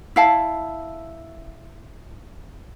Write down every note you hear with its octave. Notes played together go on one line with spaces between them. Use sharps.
E4 F5 A5